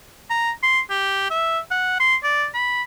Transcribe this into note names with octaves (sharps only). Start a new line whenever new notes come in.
A#5
C6
G4
E5
F#5
C6
D5
B5